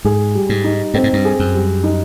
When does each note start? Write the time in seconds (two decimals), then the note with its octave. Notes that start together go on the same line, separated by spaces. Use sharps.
0.05 G#2 G#4
0.35 G3
0.49 G#2
0.64 D#4
0.94 G2 C4
1.04 G#2
1.13 G2
1.25 G#4
1.39 F#2
1.54 G3
1.84 D#4